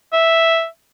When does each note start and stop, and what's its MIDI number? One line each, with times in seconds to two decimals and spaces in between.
0.13 0.66 76